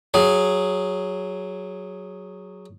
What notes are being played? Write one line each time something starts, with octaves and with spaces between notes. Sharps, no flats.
F#3 G#4